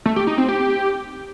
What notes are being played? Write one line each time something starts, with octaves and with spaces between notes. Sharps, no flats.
A3
G4
D#4
C4
G4